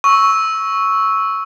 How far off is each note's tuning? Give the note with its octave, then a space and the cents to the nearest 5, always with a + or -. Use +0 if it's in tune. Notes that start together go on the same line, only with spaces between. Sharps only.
C#6 +0 E6 -10